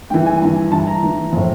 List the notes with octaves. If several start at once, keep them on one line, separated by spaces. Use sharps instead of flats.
G2 E3 G5
G#5
G2 E3
G2 E3 A5
A#5
G2 E3
A2 F3